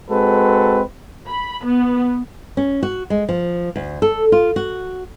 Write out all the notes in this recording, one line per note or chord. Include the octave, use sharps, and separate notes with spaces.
G#3 C4 F#4 A4 B4
B5
B3
C#4
F#4
G#3
F3
D2
A4
F4
F#4